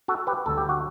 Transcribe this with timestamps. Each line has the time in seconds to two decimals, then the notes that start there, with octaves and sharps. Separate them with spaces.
0.08 F#4 A4
0.27 G4 B4
0.46 D2 D3 G3 A4
0.57 G4
0.69 F#4